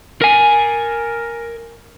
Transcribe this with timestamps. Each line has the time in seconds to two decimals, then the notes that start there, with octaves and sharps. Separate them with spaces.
0.21 A#4 G#5